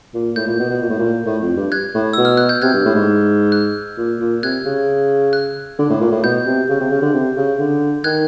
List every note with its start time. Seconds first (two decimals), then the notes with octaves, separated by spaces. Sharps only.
0.14 A#2
0.36 A2 G6
0.47 A#2
0.59 B2
0.70 B2
0.82 A#2
0.90 A2
0.99 A#2
1.26 A2
1.42 F2
1.57 G2
1.72 F#6 G#6
1.94 A2
2.13 B2 E6
2.25 F6
2.37 F#6
2.49 G6
2.62 C3 F#6 G#6
2.74 G2
2.85 A2
2.95 G#2
3.52 F#6
3.97 A#2
4.20 A#2
4.43 C3 F#6 G#6
4.65 C#3
5.33 F#6
5.78 D3
5.90 A2
6.01 A#2
6.12 A2
6.23 B2 G6
6.46 C3
6.69 C#3
6.80 C3
6.91 C#3
7.02 D3
7.14 C3
7.37 C#3
7.59 D3
8.04 D#3 F#6 G#6